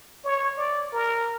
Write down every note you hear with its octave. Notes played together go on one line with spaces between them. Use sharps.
C#5
D5
A#4